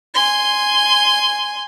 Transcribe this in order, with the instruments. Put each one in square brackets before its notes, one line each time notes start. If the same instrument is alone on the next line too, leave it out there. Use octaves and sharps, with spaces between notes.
[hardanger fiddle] G#5 C6